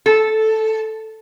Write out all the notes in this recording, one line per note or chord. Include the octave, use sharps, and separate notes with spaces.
A4